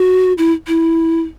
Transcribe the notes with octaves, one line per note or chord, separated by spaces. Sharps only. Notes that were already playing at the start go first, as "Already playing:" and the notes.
Already playing: F#4
E4
E4